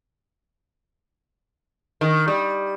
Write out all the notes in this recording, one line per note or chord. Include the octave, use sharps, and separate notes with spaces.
D#3
G3